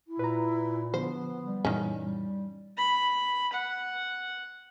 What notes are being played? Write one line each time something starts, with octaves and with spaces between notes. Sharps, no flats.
E4
A#2 B4 A#5
D3 F3 B3 C5
G3
F#2 A#2 D#3 E3 C#4
G3
B5
F#5